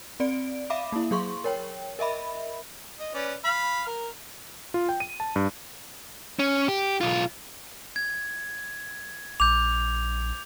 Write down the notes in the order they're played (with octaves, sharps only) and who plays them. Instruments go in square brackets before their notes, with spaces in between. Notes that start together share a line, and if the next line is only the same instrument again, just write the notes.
[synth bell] C4 D5 D7
E5 F5 B5 D6
A#3 E4
F#3 G#4 C6 C#6
A#4 C#5 G5
A#4 D#5 E5 B5
[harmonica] D#5
C#4 B4 D5
F5 B5
A#4
[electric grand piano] F4
G5
D#7
A5
G2
[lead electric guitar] C#4
G4
B1 F4
[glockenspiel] G#6
[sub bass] A#1 [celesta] D6 [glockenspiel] G6 F7